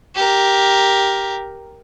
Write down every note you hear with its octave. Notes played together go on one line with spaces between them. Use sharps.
G4 A#4